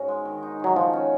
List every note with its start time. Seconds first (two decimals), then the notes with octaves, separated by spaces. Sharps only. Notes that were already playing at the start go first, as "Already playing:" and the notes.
Already playing: G#2 C#4 F#4
0.08 G#3
0.25 D#3
0.43 D#4
0.60 D#3 F#3
0.76 F3 F#4
0.93 C#4